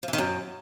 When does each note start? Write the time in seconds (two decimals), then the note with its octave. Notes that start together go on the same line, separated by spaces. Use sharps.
0.03 F3
0.08 E3
0.13 D#3
0.18 F#2